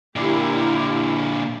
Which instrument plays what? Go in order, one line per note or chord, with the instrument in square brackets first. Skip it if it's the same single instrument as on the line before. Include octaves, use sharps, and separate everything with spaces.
[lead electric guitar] A#2 D3 [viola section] E4 G4 A#4